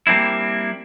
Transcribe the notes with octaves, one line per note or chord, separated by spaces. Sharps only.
G3 A#3 C4 D4 E4